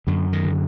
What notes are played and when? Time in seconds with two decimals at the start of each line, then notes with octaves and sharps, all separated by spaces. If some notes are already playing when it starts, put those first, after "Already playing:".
0.07 F#2 D3
0.33 D#3
0.45 D3